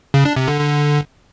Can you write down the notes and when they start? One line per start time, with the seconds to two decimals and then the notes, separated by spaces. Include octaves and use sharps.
0.14 C#3
0.25 D4
0.36 C3
0.48 D3
0.59 D3